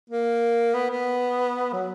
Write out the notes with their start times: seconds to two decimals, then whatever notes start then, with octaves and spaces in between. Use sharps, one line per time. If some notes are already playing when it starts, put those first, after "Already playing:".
0.09 A#3
0.74 B3
0.90 B3
1.72 F#3